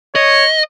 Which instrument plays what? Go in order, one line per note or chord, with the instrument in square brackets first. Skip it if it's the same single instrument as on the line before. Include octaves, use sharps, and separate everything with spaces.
[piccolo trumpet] C#5 [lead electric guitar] D#5